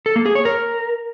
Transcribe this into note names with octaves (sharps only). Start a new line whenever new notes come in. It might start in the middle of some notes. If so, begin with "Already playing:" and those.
A4
A#3
G#4
C#5
A#4